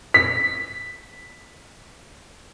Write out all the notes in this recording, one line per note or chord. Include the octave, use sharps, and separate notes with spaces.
B6